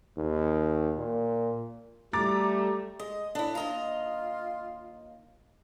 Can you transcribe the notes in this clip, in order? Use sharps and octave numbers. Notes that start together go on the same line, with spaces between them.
D#2
A#2
G3 A3 A#5 D6 A6
G#3 D#5
A2 D4 E4
D#2 F4 D#5 A#5